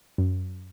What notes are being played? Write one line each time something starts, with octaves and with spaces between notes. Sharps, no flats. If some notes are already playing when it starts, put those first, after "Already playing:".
F#2